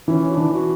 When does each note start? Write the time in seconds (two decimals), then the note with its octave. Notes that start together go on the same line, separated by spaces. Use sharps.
0.07 E3 C#4
0.30 F#4
0.34 E3 D4
0.53 F#4